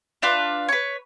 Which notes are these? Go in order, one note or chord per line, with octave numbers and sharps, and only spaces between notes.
D4 F4 B4
B4 C#5